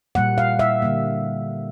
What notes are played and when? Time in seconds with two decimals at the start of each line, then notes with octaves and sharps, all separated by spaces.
0.15 A#2 G3 A#3 F#5
0.38 F5
0.59 E5
0.82 D3 G3 A#3